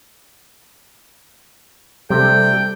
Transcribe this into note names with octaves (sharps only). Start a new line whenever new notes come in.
C3 G3 A3 D4 A4 G5